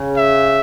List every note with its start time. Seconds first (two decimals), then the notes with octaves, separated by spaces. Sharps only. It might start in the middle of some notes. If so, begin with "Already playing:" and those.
Already playing: C#3
0.17 E5